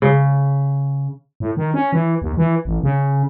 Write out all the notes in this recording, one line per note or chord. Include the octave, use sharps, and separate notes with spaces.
C#3
A2
D#3
C#4
E3
D#2
E3
A1
C#3